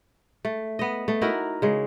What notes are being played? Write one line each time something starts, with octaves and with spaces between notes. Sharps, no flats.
A3
B3 D#5
A3
D#4 E4 F#4 A#4
C#3 G#3